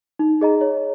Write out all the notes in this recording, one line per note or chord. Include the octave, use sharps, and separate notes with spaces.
D#4
G#4 D#5 A#5
C#5